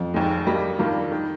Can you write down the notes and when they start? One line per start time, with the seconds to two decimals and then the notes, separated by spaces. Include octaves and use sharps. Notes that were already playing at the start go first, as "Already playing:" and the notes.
Already playing: F2
0.14 F1 D#2 D#3 G#3
0.47 G2 G3 A#3 D#4
0.79 G2 D#3 G3 A#3 F4
1.12 D#3